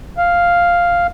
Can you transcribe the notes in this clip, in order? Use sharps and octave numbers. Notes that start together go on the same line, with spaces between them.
F5